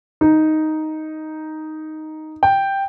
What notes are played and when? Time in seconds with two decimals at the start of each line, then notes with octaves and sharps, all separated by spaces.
0.21 D#4
2.43 G5